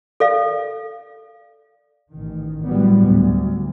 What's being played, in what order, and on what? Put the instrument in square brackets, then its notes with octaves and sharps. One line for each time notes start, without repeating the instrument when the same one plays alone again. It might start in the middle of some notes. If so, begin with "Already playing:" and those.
[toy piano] A4 D5 F5
[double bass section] A1 D#3
A2 D3 F#3 G3 B3
D2